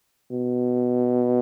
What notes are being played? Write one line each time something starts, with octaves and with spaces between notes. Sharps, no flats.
B2